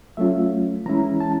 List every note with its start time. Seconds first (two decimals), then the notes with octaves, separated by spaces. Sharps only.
0.17 F#3 A3 C#4 F4 E5
0.86 E3 G#3 C#4 E4 A#5
1.20 A5